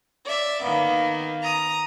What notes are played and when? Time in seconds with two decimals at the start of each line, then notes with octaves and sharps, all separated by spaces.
0.24 D5 E5
0.63 D#3 A#3 B3
1.42 A#5 D#6